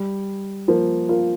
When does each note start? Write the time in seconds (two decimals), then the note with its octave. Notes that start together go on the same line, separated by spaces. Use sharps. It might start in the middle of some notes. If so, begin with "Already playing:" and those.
Already playing: G3
0.68 F3 A#3
1.09 F4 A#4